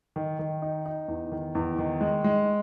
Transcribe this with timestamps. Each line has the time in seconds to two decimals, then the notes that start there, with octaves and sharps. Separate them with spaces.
0.16 D#3
0.39 D#3
0.62 D#4
0.86 D#4
1.08 E2
1.32 D#3
1.55 E2
1.78 D#3
2.01 G#3
2.24 G#3